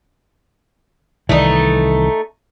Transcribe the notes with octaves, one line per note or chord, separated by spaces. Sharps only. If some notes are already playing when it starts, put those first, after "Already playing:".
C2 D#3 E3 A3 D#4